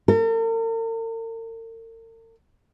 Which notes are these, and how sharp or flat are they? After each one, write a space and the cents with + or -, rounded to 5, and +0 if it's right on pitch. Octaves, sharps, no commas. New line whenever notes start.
A#4 -45